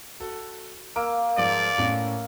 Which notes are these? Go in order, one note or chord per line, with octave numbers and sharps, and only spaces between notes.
F#4 A4
A#3 E6 D7
G#2 F3 D5
A2 C#4